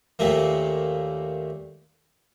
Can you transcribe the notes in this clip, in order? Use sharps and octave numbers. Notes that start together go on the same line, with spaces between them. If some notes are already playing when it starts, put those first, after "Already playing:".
D#2 A#2 A3 A#3